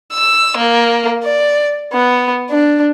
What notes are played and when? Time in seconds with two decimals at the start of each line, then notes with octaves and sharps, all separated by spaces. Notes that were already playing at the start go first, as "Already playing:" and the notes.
0.13 E6
0.57 A#3
1.24 D5
1.93 B3
2.50 D4